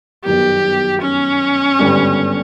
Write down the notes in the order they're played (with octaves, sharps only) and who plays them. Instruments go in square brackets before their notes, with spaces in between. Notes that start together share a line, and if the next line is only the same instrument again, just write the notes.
[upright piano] G1 F#2 D#3 F#3 B3 [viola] G4
[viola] C#4
[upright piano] G#1 G2 D3 G3 B3